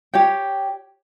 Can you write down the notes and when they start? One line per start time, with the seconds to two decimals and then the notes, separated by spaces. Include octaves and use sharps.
0.14 G4 C#5 G5